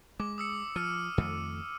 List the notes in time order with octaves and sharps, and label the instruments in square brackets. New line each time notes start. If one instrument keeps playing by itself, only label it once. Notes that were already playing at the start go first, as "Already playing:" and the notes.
[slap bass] G#3 [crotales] D6
[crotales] D#6 E6 C#7
[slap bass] F3 [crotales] F6 D#7
[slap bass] F2 D#3 A3